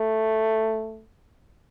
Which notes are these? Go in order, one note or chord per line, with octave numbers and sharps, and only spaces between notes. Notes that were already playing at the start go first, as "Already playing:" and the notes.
Already playing: A3